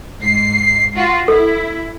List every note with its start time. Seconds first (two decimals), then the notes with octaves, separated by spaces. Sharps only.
0.19 G#2 C7
0.95 F4 F#4
1.28 E4 A4